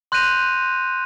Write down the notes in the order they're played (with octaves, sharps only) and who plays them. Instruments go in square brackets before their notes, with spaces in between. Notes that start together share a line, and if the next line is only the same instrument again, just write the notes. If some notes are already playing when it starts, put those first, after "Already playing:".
[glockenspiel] C6 F#6 G6 A#6 D#7 F7